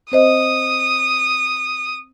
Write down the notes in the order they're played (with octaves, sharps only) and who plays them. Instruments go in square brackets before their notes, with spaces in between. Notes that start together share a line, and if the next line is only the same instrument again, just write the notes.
[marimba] C4 C5 D#5 [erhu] D#6